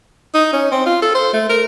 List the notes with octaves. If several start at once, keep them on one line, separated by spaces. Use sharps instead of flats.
D#4
C#4
C4
F4
A4
C5
A3
A#4